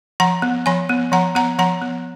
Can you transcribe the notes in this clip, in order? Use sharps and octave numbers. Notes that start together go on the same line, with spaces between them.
F3 F#5 A#5
B3
F3 G#5 B5
B3
F3 F#5 A#5
B3 F#5 A#5
F3 F#5 A#5
B3